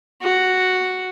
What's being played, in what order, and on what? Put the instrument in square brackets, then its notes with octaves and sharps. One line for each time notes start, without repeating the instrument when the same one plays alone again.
[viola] F#4